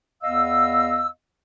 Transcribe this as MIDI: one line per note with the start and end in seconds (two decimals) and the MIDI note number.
0.23 1.08 40
0.23 1.08 59
0.23 1.08 75
0.23 1.08 77
0.23 1.08 88